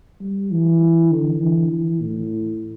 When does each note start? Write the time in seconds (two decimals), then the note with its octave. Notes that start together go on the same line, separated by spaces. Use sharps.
0.20 G3
0.51 E3
1.11 D3
1.41 E3
1.72 E3
2.02 A2